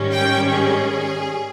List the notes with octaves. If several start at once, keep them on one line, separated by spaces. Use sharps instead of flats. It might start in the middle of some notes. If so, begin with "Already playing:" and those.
Already playing: G#2 D#3 G3 C#4
G5
G#4